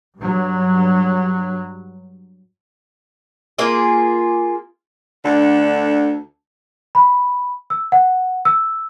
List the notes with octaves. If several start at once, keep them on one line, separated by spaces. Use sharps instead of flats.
G2 F#3
A#3 F4 G#4
D2 D3 A4
B5
E6
F#5
E6